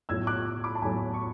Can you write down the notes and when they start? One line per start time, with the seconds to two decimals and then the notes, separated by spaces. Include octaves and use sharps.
0.09 B1 A2 F#3 E6 G#6
0.27 D6 F#6
0.64 B5 D6
0.75 A5
0.82 B1 A2 F#3 G#5 B5
1.14 C#6